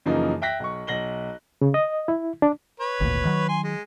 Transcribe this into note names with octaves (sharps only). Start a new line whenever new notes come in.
F#2 C#3 E3 F3 A#3 D#4
E5 G5 F#6 A#6 B6
B1 C#6
B1 A#6 F#7 G7
C#3
D#5
E4
D4
B4 C#5
G#1 D2 A#2
D#3 F#3
G#5 C6
G#3